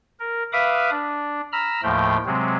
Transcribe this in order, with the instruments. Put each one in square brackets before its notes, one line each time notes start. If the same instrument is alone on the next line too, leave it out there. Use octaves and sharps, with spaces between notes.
[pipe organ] A#4
B4 E5 F5 B5 D6 D#6
D4
A#5 B5 E6 F6
D#2 A2 F3 A3 G5
C3 F#3 G#3 C4